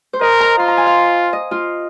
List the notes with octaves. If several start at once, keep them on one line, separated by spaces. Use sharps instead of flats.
C5
A#4 D#5
A#5
F4 C6
A#5
G#5
F5
D#5
F4